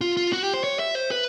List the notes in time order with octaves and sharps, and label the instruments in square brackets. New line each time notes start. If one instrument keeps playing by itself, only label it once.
[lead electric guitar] F4
F4
F#4
G4
C5
C#5
E5
C5
B4